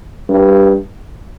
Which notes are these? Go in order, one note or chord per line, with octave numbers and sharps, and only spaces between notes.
G2